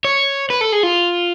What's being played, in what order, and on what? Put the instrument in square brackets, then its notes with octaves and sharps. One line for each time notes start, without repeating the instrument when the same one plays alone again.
[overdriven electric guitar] C#5
B4
A4
G#4
F4